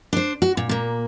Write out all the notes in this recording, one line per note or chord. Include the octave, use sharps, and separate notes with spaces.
D4 C5
F#4
A#2
A#2 A#3